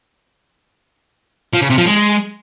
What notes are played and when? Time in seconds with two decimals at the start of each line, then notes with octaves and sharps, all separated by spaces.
1.54 F3
1.62 C#3
1.70 C3
1.78 F3
1.86 G#3